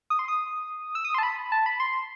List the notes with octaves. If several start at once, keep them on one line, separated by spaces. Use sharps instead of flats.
D#6
C6
D#6
E6
D#6
C6
A5
B5
A5
B5
C6